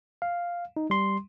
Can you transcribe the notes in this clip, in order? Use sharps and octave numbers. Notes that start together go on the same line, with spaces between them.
F5
D#4
G3 C6